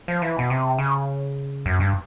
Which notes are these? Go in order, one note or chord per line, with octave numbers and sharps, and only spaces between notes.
F3
E3
B2
C3
C#3
F#2
G2